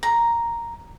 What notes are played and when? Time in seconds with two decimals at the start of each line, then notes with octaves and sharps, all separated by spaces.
0.03 A#5